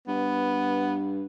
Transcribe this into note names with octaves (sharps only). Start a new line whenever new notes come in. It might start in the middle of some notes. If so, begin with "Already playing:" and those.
G2 B3